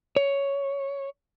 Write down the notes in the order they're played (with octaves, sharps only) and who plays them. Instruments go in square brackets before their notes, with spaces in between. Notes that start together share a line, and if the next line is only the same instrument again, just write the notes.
[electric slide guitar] C#5